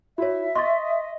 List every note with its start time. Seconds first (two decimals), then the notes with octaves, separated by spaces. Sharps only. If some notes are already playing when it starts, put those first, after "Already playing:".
0.18 E4 F#4 C#5 E5
0.55 D#5 C6 C#6 A6